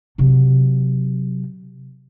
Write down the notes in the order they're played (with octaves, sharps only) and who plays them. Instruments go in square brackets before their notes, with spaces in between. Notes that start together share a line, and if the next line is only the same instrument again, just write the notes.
[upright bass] C3 F#3